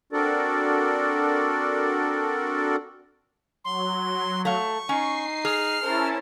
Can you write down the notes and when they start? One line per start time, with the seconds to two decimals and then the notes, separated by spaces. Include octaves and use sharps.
0.12 C4 D4 F#4 A4 A#4 D5
3.65 F#3 C6
4.45 A3 F5 C#6
4.89 C#4 D#4 C7
5.45 G#4 F6
5.81 C#4 E4 A#4 C5 A5